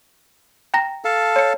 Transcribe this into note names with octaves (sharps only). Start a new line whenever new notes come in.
G5 A#5 A#6
A4 F5 A5
C#5 C#7